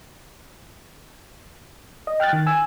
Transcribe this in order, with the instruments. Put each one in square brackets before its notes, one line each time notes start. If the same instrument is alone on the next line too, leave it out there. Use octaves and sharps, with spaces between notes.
[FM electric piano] D#5
G5 F6 F#6 A6
D#3
G#5 E6